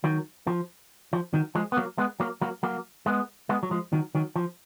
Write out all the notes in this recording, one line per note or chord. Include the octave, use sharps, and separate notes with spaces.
D#3 F#3
F3
F3
D#3 F#3
F3 G#3
B3
F#3 A#3
G#3 B3
F#3 A#3
F#3 A#3
F#3 A#3
G#3 B3
G#3 B3
F#3
F3 G#3
D#3 F#3
D#3 F#3
F3